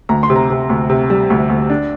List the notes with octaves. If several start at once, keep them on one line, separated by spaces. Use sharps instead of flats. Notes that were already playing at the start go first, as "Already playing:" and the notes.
D2 A#5
C6
C3
A#5
C3
D2
C3
G3
D2
D2
D4